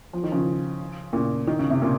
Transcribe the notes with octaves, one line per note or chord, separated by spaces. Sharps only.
F3
D#3
C#3 F3
A#2 C#3
D#3
C#3
C3
A#2 C#3